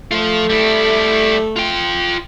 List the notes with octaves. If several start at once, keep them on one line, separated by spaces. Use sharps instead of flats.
F3 A3 F4
G3 E4
F4 G5